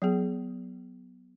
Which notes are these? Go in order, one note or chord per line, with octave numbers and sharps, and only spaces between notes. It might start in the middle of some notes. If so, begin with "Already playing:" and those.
F#3 B3 G#4